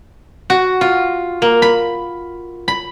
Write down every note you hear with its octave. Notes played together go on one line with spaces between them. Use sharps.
F#4
F4
A#3
B5
B5